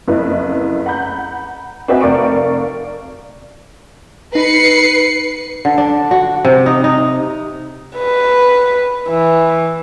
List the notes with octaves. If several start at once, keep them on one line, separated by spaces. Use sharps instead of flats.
F#1 F2 E4 B4 E5
F#5 A#5 B5 G6
C4 F#4 B4 D#5 E5 G#5
F1 A#4 D5 F5 C#6 D7
D#4 B4 C7 C#7
D3
D4
F#4
C3
D#4
D#4
B4
E3